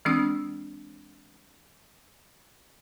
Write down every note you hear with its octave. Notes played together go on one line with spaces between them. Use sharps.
E3 G#3 C4 D4 D#6 E6